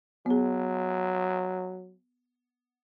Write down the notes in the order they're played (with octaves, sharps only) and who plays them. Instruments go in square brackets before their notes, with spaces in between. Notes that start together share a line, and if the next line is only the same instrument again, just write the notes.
[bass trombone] F#3 [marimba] B3 G#4